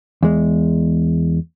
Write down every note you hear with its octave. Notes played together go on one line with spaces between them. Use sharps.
E2 G#3